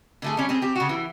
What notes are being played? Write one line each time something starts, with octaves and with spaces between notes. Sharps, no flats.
D3 A3 G#4
G3 C#4
C4 G#4
C4 G4
C#3 F#4
E3